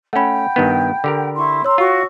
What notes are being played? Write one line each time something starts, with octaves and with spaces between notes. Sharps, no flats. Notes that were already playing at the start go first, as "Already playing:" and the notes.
A3 C#4 F#5 G5 B5
G2 D#3 B3
D3 G4 A#4
E4 C6 C#6
C#5 A#5 C6 E6
F4 F#4 C#6